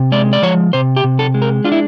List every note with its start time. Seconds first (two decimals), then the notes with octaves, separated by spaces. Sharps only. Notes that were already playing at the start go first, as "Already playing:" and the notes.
Already playing: C3
0.12 G#3 D5
0.33 D5
0.42 F3 C#5
0.73 C3 C5
0.97 G4
1.04 C3
1.19 A4
1.34 G#3
1.42 A#4
1.64 D4 F4
1.72 E4